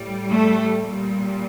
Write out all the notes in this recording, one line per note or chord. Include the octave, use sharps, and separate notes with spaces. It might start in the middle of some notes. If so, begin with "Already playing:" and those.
Already playing: A2 G3
A3
A#2 G3